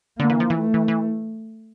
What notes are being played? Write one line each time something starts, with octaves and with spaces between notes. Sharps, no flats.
D3 A#3
E3
F3
E3
A3
E3
E3